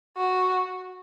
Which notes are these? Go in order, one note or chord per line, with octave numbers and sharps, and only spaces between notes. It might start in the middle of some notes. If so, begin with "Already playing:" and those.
F#4